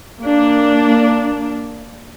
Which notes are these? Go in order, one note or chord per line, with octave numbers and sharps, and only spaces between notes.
A#3 D4